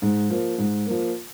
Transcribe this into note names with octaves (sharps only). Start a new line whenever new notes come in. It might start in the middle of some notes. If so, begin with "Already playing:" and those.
G#2
F3 A#3
G#2
F3 A#3